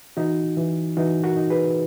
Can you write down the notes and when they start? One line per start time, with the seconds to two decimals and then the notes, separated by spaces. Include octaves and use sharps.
0.17 E3 D#4 F#4
0.57 E3
0.97 E3 D#4 F#4
1.24 F#4 A#4
1.37 D#4
1.50 G#4 B4